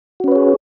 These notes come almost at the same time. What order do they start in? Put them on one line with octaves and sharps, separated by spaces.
F#4 C#4 B4 C#5 G#4